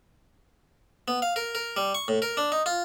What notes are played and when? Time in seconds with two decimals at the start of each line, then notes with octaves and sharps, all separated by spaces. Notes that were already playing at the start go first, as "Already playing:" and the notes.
1.08 B3
1.22 F5
1.36 A#4
1.55 A#4
1.77 G3
1.95 C#6
2.08 A2
2.22 A#4
2.37 D4
2.52 D#4
2.66 F4